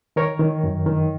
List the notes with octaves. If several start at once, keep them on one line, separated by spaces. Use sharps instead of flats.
D#3 A#4 C#5
D#3
F#2
D#3